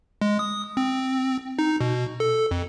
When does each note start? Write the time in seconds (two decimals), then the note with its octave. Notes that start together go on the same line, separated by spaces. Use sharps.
0.21 G#3
0.39 D#6
0.77 C4
1.59 D#4
1.81 B2
2.20 A4
2.51 F2